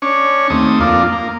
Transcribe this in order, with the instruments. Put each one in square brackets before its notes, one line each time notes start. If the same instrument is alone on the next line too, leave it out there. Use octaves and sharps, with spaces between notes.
[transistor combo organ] C#4 D4 C#5
D#2 A3 C4 D#6
F2 A#3 D4 F4
A#3